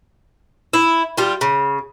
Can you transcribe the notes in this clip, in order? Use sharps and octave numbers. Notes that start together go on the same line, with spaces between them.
E4
G3 F4
C#3